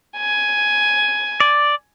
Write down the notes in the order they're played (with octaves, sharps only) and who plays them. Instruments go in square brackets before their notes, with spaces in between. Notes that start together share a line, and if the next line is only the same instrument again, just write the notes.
[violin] G#5
[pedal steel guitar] D5